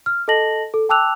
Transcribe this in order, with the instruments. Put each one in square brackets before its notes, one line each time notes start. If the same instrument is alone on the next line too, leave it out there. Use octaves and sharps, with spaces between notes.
[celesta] F6
A4 D#5 A5 A#6 F#7
A4
G5 A5 D6 E6 F#6 F7